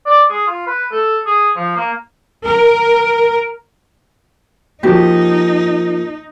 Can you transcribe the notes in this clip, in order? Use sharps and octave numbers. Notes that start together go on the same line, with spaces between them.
D5
G#4
F4
B4
A4
G#4
F3
A#3
A#4
F3 A#3 D#4 F#4 G4